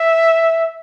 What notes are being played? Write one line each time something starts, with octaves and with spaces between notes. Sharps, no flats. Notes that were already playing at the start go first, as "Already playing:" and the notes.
Already playing: E5